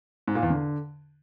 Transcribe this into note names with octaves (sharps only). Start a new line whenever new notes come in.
G#2
A#2
E2
D3